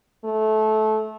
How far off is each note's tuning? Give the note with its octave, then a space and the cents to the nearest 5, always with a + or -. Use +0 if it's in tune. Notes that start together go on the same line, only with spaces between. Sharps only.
A3 -20